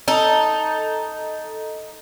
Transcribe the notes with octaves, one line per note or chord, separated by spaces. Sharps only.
D#4 A4